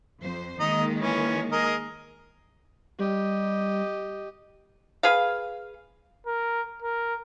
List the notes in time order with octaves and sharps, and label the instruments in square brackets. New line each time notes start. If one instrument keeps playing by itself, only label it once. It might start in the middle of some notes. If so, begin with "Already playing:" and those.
[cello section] F2 C5
[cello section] D#3 G#3 A#3 [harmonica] D#4 D#5
[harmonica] E3 C#4
G#4 A#4 D#5
[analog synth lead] G3 [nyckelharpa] G4 D#5
[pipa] G#4 B4 F5
[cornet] A#4
A#4